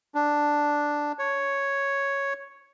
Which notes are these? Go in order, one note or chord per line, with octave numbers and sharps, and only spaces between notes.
D4
C#5